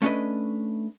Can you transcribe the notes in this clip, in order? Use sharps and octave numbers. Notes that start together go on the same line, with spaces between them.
A3 C#4 D4 F#4 B4 D#5